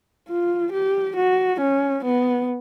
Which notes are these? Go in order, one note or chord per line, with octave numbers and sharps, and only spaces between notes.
F4
G4
F#4
C#4
B3